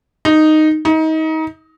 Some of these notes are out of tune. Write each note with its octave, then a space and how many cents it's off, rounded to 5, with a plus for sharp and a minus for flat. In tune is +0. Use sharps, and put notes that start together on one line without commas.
D#4 -5
D#4 +30